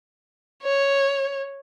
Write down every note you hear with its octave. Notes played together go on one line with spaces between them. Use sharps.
C#5